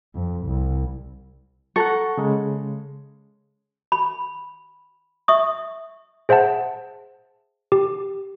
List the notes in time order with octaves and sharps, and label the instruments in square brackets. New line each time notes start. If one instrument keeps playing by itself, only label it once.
[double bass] F2
C2
[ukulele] A4 [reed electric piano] F#5 A#5 C#6
[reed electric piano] C#3 G#3
[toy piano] B5
E5 C#6 D#6
[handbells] G#4 C5 E5 F#5 A5
G4